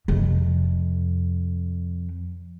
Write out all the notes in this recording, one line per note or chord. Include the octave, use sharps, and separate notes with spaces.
F2 C3